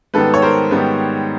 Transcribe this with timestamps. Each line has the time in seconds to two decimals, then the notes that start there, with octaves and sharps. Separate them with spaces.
0.14 G#2 D#3 G3 B3 A4 B4
0.34 C#5
0.42 A#4 C5
0.71 G#2 D#3 G3 B3